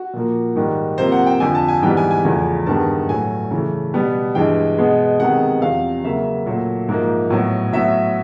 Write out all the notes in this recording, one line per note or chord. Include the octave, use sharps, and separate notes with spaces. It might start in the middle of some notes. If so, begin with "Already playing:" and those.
Already playing: F#4
A#2 F3 A#3
G#2 D#3 G3
C3 F3 A#3 C5
F#5
G5
F2 D3 F3 G#5
A5
G#5
G#2 E3 G3 B3 G5
G#5
G#5
E2 C#3 F3 A3 G#5
G2 D#3 G#3 B3 A5
A2 F#3 A3 G#5
C#3 E3 A3
B2 G3 B3
G2 E3 G#3 G5
B2 G#3 B3
C3 D#3 G#3 B3 F#5
E2 C3 F3 F5
C#3 F#3 A#3 E5
A#2 F#3 A3
G#2 F3 A#3
A2 F#3 B3
A2 F#3 B3 E5